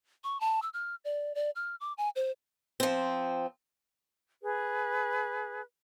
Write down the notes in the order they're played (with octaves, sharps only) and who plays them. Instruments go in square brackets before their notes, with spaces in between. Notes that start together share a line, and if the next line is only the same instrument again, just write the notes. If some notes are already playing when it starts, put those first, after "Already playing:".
[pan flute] C#6
A5
E6
F6
D5
D5
F6
D6
G#5
C5
[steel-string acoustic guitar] F3 C4
[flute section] G#4 B4